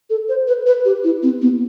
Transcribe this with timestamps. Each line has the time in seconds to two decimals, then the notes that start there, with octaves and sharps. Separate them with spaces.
0.10 A4
0.29 C5
0.47 B4
0.67 B4
0.85 G4
1.04 E4
1.23 C4
1.42 B3